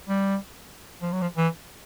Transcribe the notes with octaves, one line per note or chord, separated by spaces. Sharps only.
G3
F3
F#3
F3
E3